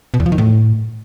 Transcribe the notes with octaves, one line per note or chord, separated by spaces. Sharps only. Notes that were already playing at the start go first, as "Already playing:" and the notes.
B2
E2
F3
D#3
A2